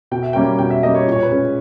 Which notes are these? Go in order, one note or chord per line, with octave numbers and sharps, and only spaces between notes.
B2 G5
E5
G3 A#3 C#4 G5
B2 G5
E5
G3 A#3 C#4 D#5
C#5
A#2
C#5
B4
G#3 C#4